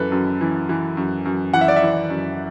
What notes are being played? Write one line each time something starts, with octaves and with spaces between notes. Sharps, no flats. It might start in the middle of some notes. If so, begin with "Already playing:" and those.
Already playing: F#2 E3 A4 B4
F#2
E3
E3
F#2
F#2
E3 F#5
E5
D5
E5
E3
F#2